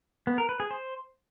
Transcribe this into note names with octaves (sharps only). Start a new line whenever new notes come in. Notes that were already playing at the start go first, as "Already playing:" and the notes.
B3
A#4
B4
G#4
C5